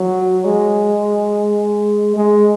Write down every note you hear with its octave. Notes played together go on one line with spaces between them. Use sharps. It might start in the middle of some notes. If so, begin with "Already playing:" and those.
Already playing: F#3
G#3
G#3